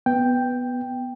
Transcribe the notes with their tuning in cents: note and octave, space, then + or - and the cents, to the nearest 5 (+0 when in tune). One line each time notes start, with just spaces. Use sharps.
B3 +0 G5 +5